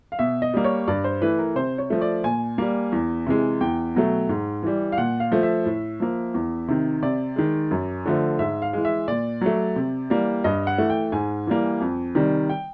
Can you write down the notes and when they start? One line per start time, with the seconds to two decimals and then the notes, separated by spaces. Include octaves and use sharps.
0.12 F5
0.19 B2 E5
0.42 D#5
0.54 G3 A#3
0.64 C#5
0.88 G2 D5
1.04 C5
1.22 E3 A3 B4
1.39 A#4
1.55 C3 C5
1.78 C#5
1.90 F3 A3
2.02 D5
2.24 A#2 G#5
2.58 G3 A#3
2.92 E2
3.27 C3 E3 G#3
3.61 E2 G5
3.95 B2 F#3 A3
4.29 G#2
4.63 E3 G3
4.92 F5
4.98 A#2 F#5
5.20 F5
5.32 F3 A3
5.43 E5
5.66 A2
6.00 F3 A#3
6.34 E2
6.68 C3 D#3
7.02 C3 D5
7.36 D#3 G#3
7.71 F#2
8.06 D3 F3 A3
8.39 G#2 E5
8.62 F5
8.73 E3 G#3
8.85 E5
9.08 A#2 D5
9.41 F#3 A3
9.76 C3
10.10 E3 G3 A#3
10.44 G2 D#5
10.67 F#5
10.78 E3 A3
10.90 G5
11.12 G#2 G#5
11.47 E3 G3 A#3
11.81 F2
12.15 C3 D#3 G3
12.49 G5